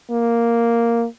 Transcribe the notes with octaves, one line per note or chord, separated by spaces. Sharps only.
A#3